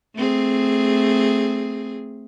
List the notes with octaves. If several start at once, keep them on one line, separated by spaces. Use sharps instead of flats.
A3 C4 G#4